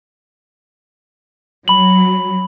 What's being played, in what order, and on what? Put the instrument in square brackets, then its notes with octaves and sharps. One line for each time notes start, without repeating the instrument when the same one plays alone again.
[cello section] F#3 [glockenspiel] B5 F#7